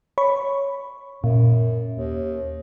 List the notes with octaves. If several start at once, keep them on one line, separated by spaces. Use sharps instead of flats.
C#5 B5 C#6
F#2 A#2
D#2